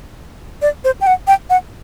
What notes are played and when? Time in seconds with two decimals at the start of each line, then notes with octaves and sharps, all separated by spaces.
0.62 D5
0.84 C5
1.01 G5
1.07 F#5
1.27 G5
1.50 F#5